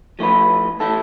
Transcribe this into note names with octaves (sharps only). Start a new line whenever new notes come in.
F3 A3 E4 B4
E3 A3 E4 A4